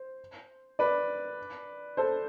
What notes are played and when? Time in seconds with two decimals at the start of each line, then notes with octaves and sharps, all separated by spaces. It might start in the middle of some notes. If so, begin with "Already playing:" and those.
Already playing: C5
0.79 B4 D5
1.97 A4 C5